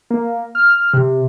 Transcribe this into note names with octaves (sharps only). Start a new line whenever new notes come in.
A#3
F6
C3